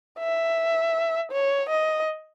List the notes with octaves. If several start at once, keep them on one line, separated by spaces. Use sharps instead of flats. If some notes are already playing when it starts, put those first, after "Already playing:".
E5
C#5
D#5